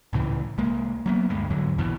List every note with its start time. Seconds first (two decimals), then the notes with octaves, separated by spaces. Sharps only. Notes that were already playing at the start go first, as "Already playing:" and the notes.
0.13 C#2 A2 C#3 E3
0.58 C2 G#3 A#3
1.06 F#3 A#3 B3
1.29 D2 G2 G#3
1.50 E2 G#2 D3 F#3
1.78 A#1 E2 B2 E3